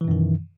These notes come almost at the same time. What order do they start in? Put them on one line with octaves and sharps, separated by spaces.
E3 B2 F#2 D#3